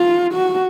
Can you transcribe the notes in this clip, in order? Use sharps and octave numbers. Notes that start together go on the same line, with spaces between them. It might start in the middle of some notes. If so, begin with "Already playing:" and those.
Already playing: F4
F#4